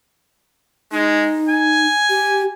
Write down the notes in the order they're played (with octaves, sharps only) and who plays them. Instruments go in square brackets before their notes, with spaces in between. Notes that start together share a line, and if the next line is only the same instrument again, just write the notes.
[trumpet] G#3 [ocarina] D#4
[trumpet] G#5
[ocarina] G4